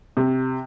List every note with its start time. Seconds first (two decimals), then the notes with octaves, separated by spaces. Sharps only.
0.17 C3